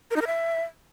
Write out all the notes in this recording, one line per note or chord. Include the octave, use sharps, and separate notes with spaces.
A#4
D#4
A#4
E5